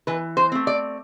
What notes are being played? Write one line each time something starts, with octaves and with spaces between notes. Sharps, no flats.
E3 B4
C5
A3 C4
D5